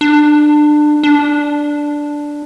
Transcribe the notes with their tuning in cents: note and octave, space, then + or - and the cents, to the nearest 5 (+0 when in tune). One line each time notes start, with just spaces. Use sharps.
D4 +25
D4 +0